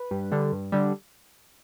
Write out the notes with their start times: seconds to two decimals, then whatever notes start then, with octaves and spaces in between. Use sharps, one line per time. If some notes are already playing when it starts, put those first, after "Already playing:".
Already playing: B4
0.11 G2
0.32 D3 G3
0.52 G2
0.72 D3 G3